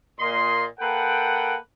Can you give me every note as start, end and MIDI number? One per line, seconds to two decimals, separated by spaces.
0.19 0.64 46
0.19 0.64 75
0.19 0.64 84
0.79 1.55 58
0.79 1.55 69
0.79 1.55 71
0.79 1.55 78
0.79 1.55 79